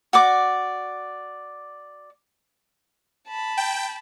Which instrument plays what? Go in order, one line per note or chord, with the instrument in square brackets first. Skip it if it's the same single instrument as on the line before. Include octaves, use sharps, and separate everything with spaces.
[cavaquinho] F#4 D5 D6
[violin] A5 B5
[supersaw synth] G5